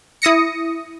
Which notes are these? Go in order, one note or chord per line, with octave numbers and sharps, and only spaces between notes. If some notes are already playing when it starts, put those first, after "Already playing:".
E4 D#6 A#6 C#7